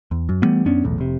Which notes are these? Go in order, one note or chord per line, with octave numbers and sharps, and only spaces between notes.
E2
F#2
E3 G3 A3 B3
F#2 B3 C#4 D4
B1 E2 A2
F1 C3